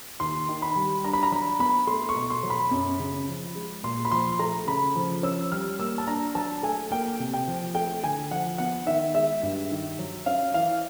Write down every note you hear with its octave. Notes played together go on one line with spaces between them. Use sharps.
D#2 C6
D#3
B5
G3
D4 A#5
B5
A#5
F#3 B5
B3 B5
A3 C6
C#6
B2
C6
F#3
B5
F#2
C#3
F3
G#3
A#2 C6
B5
F3 C6
A3 A#5
C#3 B5
F3
C#4 E6
G3 F6
A#3 E6
A5
D4 A#5
F#3 A5
A3 G#5
A#3 G5
C3
G5
F3
A3 G5
D3 G#5
F3 F#5
B3 F#5
D#3 E5
G#3 E5
G2
D#3
F#3
C#4 F5
E3 F5